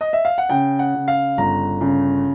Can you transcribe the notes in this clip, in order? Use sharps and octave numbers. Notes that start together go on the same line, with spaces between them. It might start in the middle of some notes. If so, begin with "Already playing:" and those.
D#5
E5
F5
F#5
C#3 G5
F#5
C#3
F5
G1 A#5
C#3